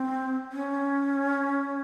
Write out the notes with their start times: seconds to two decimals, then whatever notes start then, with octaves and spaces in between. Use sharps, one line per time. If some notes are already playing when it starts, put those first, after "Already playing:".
Already playing: C4
0.52 C#4